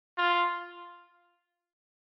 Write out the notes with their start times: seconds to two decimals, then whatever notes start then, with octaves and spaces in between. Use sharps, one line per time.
0.18 F4